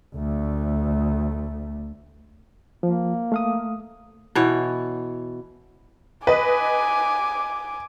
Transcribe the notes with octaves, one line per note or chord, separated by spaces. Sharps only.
D2 A3
F3 A#3
A3 F5 D#6
B2 E3 C#5
B4 D#5 G#5 D6